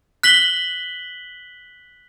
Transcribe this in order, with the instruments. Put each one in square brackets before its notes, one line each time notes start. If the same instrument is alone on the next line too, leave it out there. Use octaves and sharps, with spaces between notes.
[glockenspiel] F#6 B6 F#7 G7